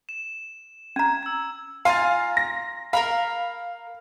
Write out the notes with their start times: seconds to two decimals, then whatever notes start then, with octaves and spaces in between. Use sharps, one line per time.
0.09 E7
0.96 C#4 A#5 G#6
1.23 E6 G#6
1.85 F4 F5 G#5 A#5 A6
2.37 A#6
2.93 A#4 F5 A#5 B5